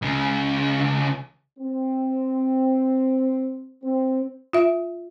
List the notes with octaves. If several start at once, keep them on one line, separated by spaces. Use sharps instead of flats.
C#2 C#3
C4
C4
F4 E5